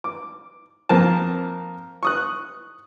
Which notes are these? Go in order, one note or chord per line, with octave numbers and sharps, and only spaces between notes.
D6
F2 A#3 C4 A5
C#6 D#6 F#6